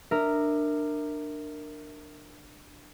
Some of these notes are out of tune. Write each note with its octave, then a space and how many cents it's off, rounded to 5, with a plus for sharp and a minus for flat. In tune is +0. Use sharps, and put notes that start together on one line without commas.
D4 +20 A#4 -10 E5 -10